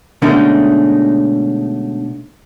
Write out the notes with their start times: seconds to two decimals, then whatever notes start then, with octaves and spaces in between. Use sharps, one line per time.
0.22 B2 D3 G#3 A3 C#4 D#4